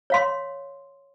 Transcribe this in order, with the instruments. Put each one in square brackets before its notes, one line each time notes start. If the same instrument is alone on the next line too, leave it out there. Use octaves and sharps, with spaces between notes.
[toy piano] C#5 F5 C6